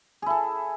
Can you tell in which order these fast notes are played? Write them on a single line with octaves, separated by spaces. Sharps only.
G#4 E4 A4